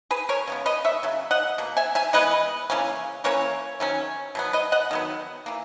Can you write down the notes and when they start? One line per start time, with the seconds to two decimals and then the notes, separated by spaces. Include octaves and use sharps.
0.11 G#4 B4
0.29 A#4 C#5
0.47 C#3 G#3 B3
0.66 B4 D#5
0.84 C#5 E5
1.03 C#3 F#3
1.31 D#5 F#5
1.58 B2 A#3
1.77 E5 G#5
1.95 E5 G#5
2.13 E3 G#3 B3 B4 D#5
2.70 C#3 E3 A#3 C#4
3.24 E3 A#3 C#4 A#4 C#5
3.80 D#3 F#3 C#4
4.35 B2 F#3 B3
4.53 B4 D#5
4.72 D#5 F#5
4.91 D#3 F#3 B3
5.46 E3 A#3